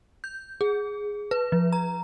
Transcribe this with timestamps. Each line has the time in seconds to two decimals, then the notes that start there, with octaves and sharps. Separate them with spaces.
0.24 G6
0.61 G#4
1.31 B4
1.52 F3
1.73 A#5